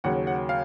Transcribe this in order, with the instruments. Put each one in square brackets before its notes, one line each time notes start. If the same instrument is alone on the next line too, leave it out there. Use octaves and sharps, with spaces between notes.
[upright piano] D#2 C#3 F#3 C#4 F#5
F#5
F5